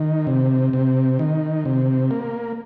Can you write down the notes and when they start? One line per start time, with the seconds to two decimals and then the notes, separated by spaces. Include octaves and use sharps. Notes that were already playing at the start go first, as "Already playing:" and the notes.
Already playing: D#3
0.27 C3
0.73 C3
1.19 D#3
1.65 C3
2.11 A#3